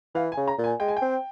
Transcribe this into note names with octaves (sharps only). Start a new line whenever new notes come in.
E3 F5
G#5
C#3
A#5
A#2
G#5
G#3 G5
G#5
G5
C4